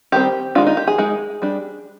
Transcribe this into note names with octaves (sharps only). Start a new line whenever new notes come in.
D#3 G3 C4 G4
D#3 G#3 D4 F4
D#4
G4
G#4
G#3 D#4
G3 D4